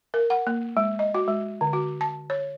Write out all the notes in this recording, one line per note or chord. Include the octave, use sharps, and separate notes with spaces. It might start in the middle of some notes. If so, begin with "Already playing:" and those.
A#4
F#5
A#3
G#3
D#5
F#4
G#3
D3
F#4
A5
C#5